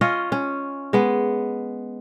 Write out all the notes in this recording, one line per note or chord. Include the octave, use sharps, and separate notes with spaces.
C#4 F4 C#5 D#5
C#4
G#3 B3